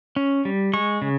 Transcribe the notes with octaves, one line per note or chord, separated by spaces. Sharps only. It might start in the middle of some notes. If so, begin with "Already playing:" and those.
C#4
G3
G#3 C#6
C#3